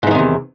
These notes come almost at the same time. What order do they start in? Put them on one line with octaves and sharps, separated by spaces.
G#2 E3 D#3 C3 E2